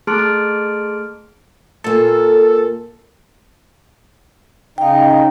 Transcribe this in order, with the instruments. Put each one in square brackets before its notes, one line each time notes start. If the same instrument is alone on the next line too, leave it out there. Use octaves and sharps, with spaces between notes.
[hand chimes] A3 G#4 A5 C6 F6 D7
[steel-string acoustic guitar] A#2 A#3 [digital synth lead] A4
[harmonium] C#3 D#4 [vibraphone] F5 G5